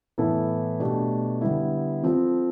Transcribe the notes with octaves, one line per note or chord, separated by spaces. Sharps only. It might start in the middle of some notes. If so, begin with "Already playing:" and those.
A2 E3 B3 E4 A4
B2 A3 D4 G4
D3 G3 B3 E4
F3 C4 F4 A4